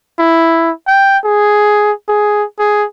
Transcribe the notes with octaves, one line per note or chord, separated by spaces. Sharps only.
E4
G5
G#4
G#4
G#4